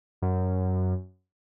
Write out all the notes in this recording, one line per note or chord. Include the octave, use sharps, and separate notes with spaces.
F#2